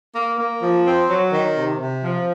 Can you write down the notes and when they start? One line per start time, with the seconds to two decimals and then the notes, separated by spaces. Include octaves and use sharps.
0.14 A#3
0.38 A#3
0.62 F3
0.85 C4
1.09 F#3
1.32 D#3
1.56 C3
1.80 C3
2.03 F3